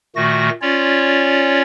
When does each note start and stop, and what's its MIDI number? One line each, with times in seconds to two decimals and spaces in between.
0.16 0.49 46
0.16 0.49 51
0.16 0.49 57
0.16 0.49 66
0.16 0.49 94
0.62 1.62 61
0.62 1.62 65
0.62 1.62 73
0.62 1.62 74